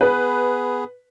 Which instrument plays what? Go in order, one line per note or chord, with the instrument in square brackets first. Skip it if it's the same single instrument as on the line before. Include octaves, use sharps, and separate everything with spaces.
[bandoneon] B3 G#4 [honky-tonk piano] B4